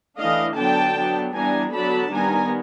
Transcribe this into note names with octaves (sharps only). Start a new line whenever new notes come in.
E3 A3 D4 D#5 F5
D3 F#3 B3 D4 G5 A5
F#3 B3 D4
E3 G3 B3 D4 G#5 A#5
D3 F#3 B3 D4 A5 B5
D#3 G3 B3 G#5 A#5